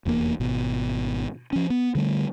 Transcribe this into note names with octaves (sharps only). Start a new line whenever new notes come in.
F1 E2 A2 A#3
G#1 B2
F3 C#4
B3
D3 G3 A3